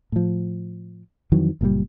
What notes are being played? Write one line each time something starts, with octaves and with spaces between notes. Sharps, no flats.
A2 F3
F2 D#3 E3 F#3
F#1 A#2 C#3 G3